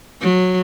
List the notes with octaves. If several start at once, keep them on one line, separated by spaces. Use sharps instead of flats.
F#3